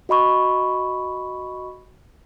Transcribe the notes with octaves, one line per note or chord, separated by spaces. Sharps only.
F#4 D#5 B5 C#6